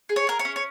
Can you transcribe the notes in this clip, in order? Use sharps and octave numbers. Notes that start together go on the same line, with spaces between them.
G#4
C#5
G#4 A#4
C#5
C#4
C#5